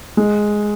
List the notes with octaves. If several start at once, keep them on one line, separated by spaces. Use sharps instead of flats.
G#3